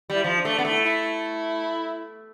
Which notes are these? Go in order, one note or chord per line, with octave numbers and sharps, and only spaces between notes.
G3
E4
F3 F4
D4
A3
B3 D4
A3
E4
E4